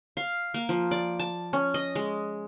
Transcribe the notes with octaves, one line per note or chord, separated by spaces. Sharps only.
F5
A#3
F3
D5
A5
C#4
D#5
G#3